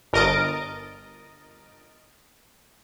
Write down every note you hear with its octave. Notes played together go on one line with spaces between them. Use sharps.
G1 A#4 D#5 A6 D7